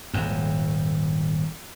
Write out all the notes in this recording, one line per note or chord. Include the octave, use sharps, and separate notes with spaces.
D#1 G#1 F2